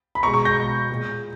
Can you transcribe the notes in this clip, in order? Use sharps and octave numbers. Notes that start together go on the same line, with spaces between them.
B5
B2 G#3 A#5 C#6
A#5 C#6
G6 A#6
B2 G#3
A#2 G#3